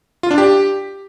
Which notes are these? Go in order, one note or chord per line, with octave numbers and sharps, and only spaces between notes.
F4
D4
G4